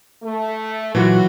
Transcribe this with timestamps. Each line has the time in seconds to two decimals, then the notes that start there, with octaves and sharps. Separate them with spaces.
0.23 A3
0.95 A#2 E3 F#3 F4 F#4